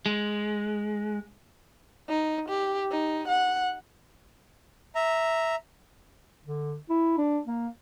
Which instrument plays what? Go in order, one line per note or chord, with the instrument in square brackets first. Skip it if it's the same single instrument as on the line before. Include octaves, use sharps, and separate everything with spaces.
[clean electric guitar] G#3
[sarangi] D#4
G4
D#4
F#5
[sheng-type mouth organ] E5 A#5
[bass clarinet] D3
E4
D4
A#3